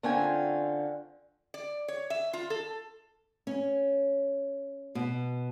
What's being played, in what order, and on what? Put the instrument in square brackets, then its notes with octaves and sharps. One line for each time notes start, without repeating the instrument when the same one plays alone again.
[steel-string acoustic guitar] D3 C4 C#4 F4 G5 G#5
[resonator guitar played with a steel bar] D5
C#5
E5
F4
A4
[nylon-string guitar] C#4
B2